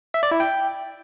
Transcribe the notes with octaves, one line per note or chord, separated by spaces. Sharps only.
E5
D5
E4
G5